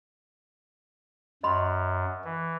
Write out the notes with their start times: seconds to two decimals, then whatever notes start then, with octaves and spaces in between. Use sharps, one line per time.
1.43 F#2 D#5 B5 C6
2.24 E3